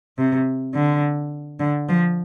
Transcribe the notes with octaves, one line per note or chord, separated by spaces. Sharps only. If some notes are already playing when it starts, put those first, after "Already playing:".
C3
D3
D3
F3